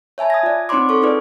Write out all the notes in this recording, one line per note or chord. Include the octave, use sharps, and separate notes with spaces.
C#5 E5 G#5 A5 B5
D#6 G#6 A#6
F4 D5
C4 D#4 C#5 B5 C6 D6
A4 C#6
D#4 F4 G#4 B4 D5